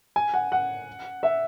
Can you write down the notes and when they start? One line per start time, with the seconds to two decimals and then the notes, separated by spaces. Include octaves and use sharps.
0.16 G#5
0.34 F#5
0.52 F#5
1.23 E5